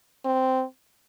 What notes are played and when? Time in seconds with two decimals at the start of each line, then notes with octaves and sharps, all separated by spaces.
0.25 C4